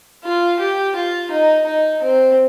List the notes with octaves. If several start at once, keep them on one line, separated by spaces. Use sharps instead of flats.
F4
G4
F4
D#4
D#4
C4